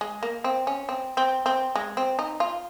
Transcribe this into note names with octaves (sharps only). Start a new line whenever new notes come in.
G#3
A#3
C4
C#4
C4
C4
C4
G#3
C4
D#4
F4